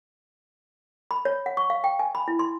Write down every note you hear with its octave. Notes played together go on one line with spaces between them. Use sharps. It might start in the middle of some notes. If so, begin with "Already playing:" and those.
B5
C#5
F#5
C#6
F5
G5
G#5
B5
E4
C6